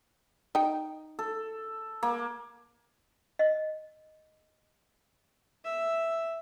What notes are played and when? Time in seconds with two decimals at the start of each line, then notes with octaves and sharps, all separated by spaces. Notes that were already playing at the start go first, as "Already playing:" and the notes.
0.55 D#4 G5
1.19 A4
2.03 A#3
3.39 D#5
5.65 E5